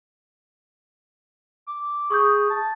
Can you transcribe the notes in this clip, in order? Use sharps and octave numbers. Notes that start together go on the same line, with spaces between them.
D6
G#4 C#6 D#6 G6
A5